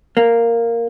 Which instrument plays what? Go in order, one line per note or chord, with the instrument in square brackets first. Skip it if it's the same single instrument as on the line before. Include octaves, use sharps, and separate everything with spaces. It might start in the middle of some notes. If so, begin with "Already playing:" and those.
[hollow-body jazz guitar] A#3